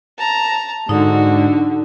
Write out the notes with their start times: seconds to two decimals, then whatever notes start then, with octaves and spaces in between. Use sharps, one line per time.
0.18 A5 A#5
0.89 G#2 D3 D#4 F#4